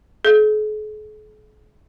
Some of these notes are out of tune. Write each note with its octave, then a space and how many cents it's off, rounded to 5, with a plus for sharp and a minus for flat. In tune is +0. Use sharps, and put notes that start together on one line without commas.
G#4 +45